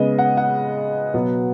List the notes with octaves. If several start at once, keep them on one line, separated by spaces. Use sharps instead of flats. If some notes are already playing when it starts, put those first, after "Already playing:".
Already playing: C#3 G#3 B3 D#5
F#5
F#5
B2 F#3 B3